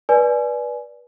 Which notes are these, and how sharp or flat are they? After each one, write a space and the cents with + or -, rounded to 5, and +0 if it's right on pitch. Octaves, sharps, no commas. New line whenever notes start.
B4 -25 D5 +0 G#5 +20